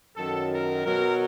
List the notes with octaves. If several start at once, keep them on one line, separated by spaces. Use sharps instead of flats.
F#2 D#3 F#3 A4
A#4
B2 F#3 A#4